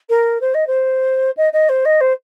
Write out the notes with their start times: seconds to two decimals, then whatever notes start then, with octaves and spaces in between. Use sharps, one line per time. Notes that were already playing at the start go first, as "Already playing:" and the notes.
0.09 A#4
0.41 C5
0.54 D#5
0.67 C5
1.37 D#5
1.52 D#5
1.69 C5
1.85 D#5
2.00 C5